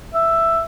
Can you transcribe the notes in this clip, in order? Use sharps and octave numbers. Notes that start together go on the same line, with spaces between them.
E5